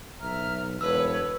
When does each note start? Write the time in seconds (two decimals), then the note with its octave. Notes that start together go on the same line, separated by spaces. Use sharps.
0.20 B1 E5 A#5 F6
0.81 E1 B4 C#5 A5 E6